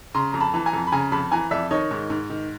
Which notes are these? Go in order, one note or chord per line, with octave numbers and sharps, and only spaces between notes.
C#3 A#5 C6
F2 A#5
A5 B5
E3 A5
G#5 A#5
F2
B5
C#3 G#5 A#5
F2 A5 B5
E3 G#5 A#5
F2 D5 E5
D#3 C#5 D#5
G#2
G#2
D#3